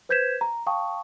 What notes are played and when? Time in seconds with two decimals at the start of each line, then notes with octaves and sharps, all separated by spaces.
0.09 B4 C5 G6 G#6 B6 E7
0.41 A#5
0.67 F5 G5 A5 C#6 D#6